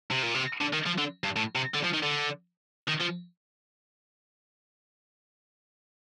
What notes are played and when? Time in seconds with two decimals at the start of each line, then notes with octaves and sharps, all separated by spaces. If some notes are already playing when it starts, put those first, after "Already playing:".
0.11 C3
0.23 A#2
0.35 C3
0.61 D3
0.73 D#3
0.86 F3
0.98 D3
1.24 G2
1.36 A2
1.55 C3
1.74 D3
1.83 F3
1.93 D#3
2.03 D3
2.88 D#3
3.00 F3